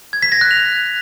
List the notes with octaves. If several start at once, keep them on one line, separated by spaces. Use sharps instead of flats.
G#6
B6
A#6
F#6
F7